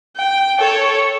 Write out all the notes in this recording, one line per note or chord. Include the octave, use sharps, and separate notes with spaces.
G5
A4 C#5